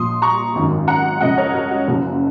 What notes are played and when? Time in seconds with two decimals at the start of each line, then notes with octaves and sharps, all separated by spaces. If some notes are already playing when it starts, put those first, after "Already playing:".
Already playing: A#1 A#2 F3 C6 D#6
0.22 A#5 C#6
0.55 G#1 F#2 D#3
0.88 F#5 A#5
1.21 C#2 C#3 F3 D#5 F#5
1.38 A#4 C#5
1.54 F#4 A#4
1.71 F#4
1.87 F#1 F#2 C#3 F3